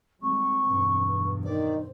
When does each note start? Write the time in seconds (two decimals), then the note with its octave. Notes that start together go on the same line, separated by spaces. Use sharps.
0.22 D#2 G3 G#3 C4 C#6
0.65 B1 E2 G2
1.44 D#3 C5 D5